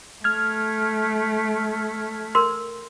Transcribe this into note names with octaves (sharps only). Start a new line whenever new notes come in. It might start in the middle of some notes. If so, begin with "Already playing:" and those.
A3 F6 G#6
A#4 C6